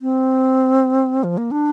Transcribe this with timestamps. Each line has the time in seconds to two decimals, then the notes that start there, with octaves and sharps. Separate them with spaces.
0.02 C4
1.24 F3
1.38 A#3
1.51 D4